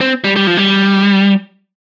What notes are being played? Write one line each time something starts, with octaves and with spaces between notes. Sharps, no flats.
C4
G3
G3
F3
G3